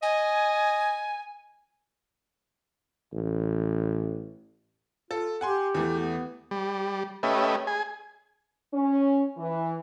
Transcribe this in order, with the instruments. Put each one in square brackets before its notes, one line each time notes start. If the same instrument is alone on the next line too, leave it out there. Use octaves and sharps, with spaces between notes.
[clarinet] D#5 [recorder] G#5
[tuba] A1
[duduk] F4 [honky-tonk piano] A4
[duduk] G4 [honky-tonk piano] F#5 G#5 C6
[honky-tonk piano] E2 E3 A3
[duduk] B3
[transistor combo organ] G3
A3 C#4 G4 B4 D#5 E5
G#4 G#5
[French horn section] C#4
E3